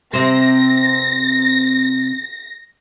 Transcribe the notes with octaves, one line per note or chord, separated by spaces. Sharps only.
C3 C4 A#6